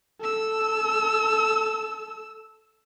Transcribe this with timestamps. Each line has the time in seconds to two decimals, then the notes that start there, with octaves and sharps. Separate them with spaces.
0.20 A4 E6